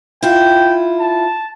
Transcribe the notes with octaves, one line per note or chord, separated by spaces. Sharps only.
E4 F4 G5
A5